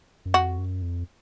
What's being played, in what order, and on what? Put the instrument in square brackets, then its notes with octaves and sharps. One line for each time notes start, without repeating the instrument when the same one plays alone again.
[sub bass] F#2
[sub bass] F2 [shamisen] F#4
[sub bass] F#2
F2